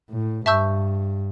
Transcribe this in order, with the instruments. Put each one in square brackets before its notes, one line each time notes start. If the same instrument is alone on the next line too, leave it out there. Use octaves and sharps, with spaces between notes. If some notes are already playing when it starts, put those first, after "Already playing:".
[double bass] A2
[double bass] G2 [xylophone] E5 A5 C#6 E6 G6